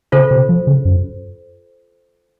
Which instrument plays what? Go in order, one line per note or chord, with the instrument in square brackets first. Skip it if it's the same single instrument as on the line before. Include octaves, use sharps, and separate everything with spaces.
[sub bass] C#3 [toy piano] F4 A4 C5
[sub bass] C3
F3
C#3
F#2